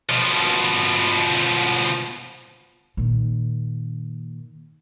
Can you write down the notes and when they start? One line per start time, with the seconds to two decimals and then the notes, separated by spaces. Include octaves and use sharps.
0.09 B2 F3
2.97 A#2 D#3